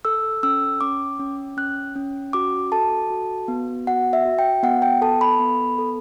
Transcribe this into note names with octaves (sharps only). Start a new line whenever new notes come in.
A4 E6
C#4 E6
C#4 D6
C#4
C#4 F#6
C#4
F#4 D6
A4 A5
F#4
B3
F#4 F#5
E5
F#4
G5
B3 F#5
G5
A4 A5
B5
B3
A4